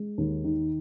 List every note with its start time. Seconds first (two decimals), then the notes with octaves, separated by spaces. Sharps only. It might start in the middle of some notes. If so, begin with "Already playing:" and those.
Already playing: G#3
0.18 D#2
0.44 D#3